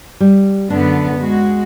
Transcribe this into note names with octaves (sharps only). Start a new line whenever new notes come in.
G3
F#2 D3 B3 D4
G#3 F#4